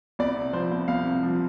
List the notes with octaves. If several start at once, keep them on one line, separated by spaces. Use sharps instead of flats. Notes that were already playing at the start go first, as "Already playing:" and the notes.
C2 D5
C3
F3 C5
C2
C2 F5
C3
F3